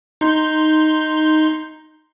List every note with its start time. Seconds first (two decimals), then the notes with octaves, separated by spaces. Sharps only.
0.21 D#4 C6 G6